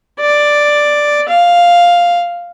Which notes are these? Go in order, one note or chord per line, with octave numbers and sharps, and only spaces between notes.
D5
F5